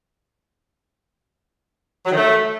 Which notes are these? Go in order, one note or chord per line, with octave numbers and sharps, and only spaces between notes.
F#3
D#3
A3